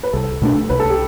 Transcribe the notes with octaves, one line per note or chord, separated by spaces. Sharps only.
B4
C2 A4
B2 A3 D4
C2 B4
A4
G4